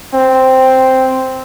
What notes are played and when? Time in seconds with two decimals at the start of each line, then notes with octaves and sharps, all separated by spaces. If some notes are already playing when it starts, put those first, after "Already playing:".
0.14 C4